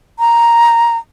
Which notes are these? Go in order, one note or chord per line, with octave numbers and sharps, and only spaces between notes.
A#5